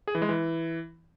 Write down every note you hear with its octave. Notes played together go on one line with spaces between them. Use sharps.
G#4
E3
G#3
E3